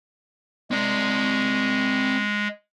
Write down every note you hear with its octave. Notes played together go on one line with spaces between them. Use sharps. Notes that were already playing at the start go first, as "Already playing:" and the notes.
G#3 C4 D5